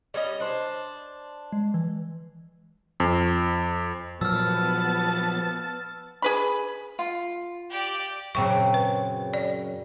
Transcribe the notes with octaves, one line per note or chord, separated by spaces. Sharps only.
G3 C#4 D#5
D4 C5
G#3
E3
F2
A#2 F3 F#3 B3 A5 E6 F6
G#4 B4 B5
F4
G4 D5
F#2 A#2 C#3 C4 G5 C#6
B4
C#5 D5